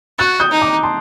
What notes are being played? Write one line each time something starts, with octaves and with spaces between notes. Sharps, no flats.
F#4 F#6 A6
D#6 G6
D#4
A#5 D6
A5 C6